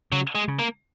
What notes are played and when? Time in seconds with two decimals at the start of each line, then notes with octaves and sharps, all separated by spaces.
0.12 C#3 F#3
0.35 G#3
0.48 C#3
0.59 A#3